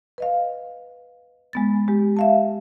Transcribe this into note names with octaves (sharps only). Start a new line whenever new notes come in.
B4 D#5 F5
G#3 B3 A6
G#3 G4
E5 F5 A5